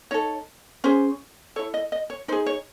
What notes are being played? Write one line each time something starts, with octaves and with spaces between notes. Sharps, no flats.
D#4 A4 C#5
C#4 G#4 C5
E4 A4 C#5
D#5
D#5
C#5
D#4 G#4 C5
C#5